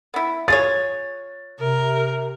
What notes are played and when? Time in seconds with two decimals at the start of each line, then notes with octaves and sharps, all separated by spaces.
0.14 B3 E4
0.48 F4 G#4 C#5 A6
1.60 C3 A#4